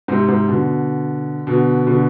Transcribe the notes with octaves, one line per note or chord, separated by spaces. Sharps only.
G#2 C3
G#2 C3
B2 D3
B2 D3
B2 D3